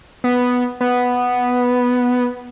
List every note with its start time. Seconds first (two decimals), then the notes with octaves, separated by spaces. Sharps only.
0.24 B3
0.81 B3